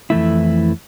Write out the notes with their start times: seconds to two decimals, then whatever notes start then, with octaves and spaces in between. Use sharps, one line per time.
0.10 F2 E3 A3 E4